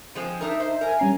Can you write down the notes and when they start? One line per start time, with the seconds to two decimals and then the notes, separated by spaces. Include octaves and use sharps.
0.15 F3 G#3 C4
0.41 D4 D#4 A#4 E5
0.60 D#4 C5 E5
0.81 A#4 G#5
0.99 G3 C#4 A#5 C7